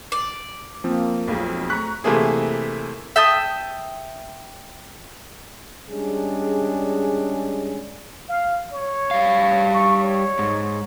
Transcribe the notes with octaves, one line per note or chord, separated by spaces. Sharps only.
D5
F3 A#3 C4
B1 F2 G#3
A3 A#5 C#6 F#6 B6
C3 E3 A3 A#3 G#4
E5 G5 A5 D#6
G3 G#3 C#4 D4 G#4
F5
C#5
G3 F5
C#6
C#5
G#2